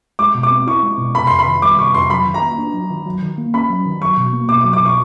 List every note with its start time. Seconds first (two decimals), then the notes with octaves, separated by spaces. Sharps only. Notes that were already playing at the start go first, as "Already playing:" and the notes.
0.19 G#3 D6
0.35 B2
0.43 D6
0.51 C4
0.67 E4 C#6
0.83 G#3
0.98 B2
1.15 C3 B5
1.27 F2 C6
1.39 B5
1.47 D#3
1.62 G3 D6
1.78 C3 C#6
1.94 F2 C6
2.10 F#3 B5
2.26 D#3
2.34 A#5
2.42 A#3
2.58 D4
2.74 F#3
2.90 D#3
3.06 F#3
3.22 D#3
3.38 A#3
3.54 C#4 B5
3.70 F#3
3.86 D#3
4.01 F#3 C#6
4.17 B2
4.33 A#3
4.49 B2 D6
4.61 D6
4.65 F#3
4.73 D6
4.81 B2 C#6